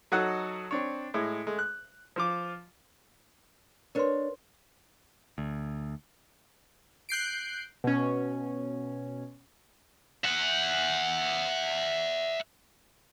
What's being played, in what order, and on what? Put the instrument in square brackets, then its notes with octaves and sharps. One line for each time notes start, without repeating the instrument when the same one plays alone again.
[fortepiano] F#3 D#4 F#4 A4 D#5 F#5
C4 D4 C#5
A2 G#3
G#3 A3
F#6
F3 F4 D6
[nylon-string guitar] D4 C#5 [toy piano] A#4 B4 C6
[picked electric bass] D2
[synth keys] F#6 G6 C7 D7
B2 C#4
[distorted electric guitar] E5 F#5